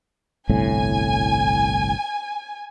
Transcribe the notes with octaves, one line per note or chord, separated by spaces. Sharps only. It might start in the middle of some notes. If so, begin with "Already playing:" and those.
G1 C2 A2 G#5